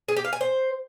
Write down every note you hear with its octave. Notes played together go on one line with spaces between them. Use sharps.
G#4
G4
F5
G#5
C5